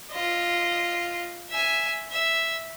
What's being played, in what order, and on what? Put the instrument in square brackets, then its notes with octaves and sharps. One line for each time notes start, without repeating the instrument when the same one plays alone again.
[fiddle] F4 D#5
E5 G#5
E5